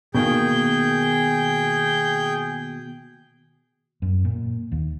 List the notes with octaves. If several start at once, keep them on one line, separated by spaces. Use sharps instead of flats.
B2 D#3 A#3 G#4 G5 G6
F#2
A#2
D#2